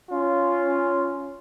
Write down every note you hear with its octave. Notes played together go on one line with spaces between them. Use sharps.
C#4 F4